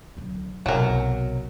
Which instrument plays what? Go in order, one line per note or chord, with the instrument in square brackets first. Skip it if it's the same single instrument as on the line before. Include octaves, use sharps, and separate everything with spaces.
[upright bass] D3 F#3
[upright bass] B1 C3 [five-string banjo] F#3 A#4